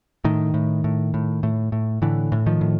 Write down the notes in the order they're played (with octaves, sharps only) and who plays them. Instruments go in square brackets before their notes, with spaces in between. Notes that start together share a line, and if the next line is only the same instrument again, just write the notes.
[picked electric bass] A2 D#3
A2
A2
A2
A2
A2
A2 D3 E3
A2
D#3 F3
A2